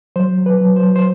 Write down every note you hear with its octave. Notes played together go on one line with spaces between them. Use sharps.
F#3 C5
F#3
B4
F#3
C5
F#3
C5